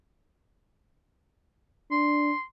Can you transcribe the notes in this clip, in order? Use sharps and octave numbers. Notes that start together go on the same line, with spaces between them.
D4 C6